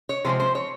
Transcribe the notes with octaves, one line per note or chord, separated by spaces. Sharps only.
C#5
C3 F3 G#3 C4 C5
C5
C#5